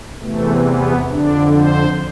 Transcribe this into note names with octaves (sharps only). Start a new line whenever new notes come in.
E2 C3 E3 A3
B3
F2 D3 D4
C5